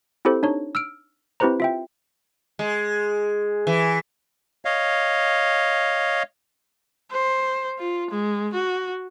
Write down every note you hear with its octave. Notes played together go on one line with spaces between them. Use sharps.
C4 E4 G4 A4 C5
D4 D#4 C#5
E6 F6 D7
C4 E4 G4 B4 C5 A#5
F4 E5 G5
G#3
E3
C#5 D#5 F5
C5
F4
G#3
F#4